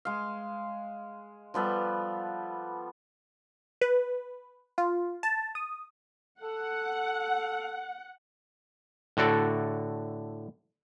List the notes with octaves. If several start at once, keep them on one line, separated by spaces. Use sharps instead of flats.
G#3 F5
F3 G3 B3 A4
B4
F4
A5
D#6
A4 F#5
A2 D3 F#4 A4 D5